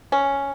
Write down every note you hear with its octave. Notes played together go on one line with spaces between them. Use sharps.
C#4